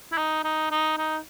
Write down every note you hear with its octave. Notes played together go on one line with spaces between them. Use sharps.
E4
D#4
D#4
D#4
D#4